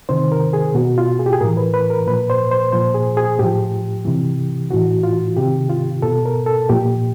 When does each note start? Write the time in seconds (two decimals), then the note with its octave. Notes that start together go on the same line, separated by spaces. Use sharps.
0.09 C3 D#3 C5
0.32 A#4
0.53 G#4
0.75 B2 F#4
0.98 F4
1.19 G#4
1.26 G4
1.33 G#4
1.41 A2 E3 A#4
1.57 B4
1.74 B4
1.90 A#4
2.07 A#2 F3 B4
2.30 C5
2.51 C5
2.73 A#2 F3 C5
2.94 G#4
3.17 G#4
3.39 A2 F3 G4
4.05 C3 E3
4.71 A2 E3 F#4
5.03 F4
5.37 C3 D#3 G4
5.70 F4
6.02 B2 A4
6.26 A#4
6.46 A4
6.69 A#2 F3 G4